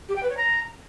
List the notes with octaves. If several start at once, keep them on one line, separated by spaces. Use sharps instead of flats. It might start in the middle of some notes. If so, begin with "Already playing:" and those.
G4
G5
B4
C#5
A#5